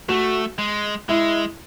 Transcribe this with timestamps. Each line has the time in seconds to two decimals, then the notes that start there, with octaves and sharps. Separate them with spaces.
0.09 A3 F#4
0.58 G#3
1.09 G#3 E4